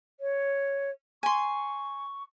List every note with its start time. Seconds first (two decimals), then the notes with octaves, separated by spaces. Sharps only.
0.20 C#5
1.23 G#5 C6 C#6